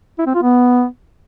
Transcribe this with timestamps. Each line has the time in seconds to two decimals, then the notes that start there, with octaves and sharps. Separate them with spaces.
0.19 E4
0.27 C4
0.34 F4
0.42 B3